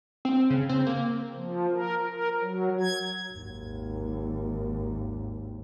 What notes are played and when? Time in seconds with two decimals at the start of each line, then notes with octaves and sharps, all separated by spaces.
0.25 C4
0.50 C#3
0.69 C4
0.86 A#3
1.34 F3
1.71 A#4
2.09 A#4
2.41 F#3
2.80 G#6
3.34 G#1 D#2